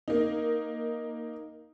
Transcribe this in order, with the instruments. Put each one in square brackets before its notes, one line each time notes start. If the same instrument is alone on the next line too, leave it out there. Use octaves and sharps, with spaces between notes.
[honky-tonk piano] A#3 D#4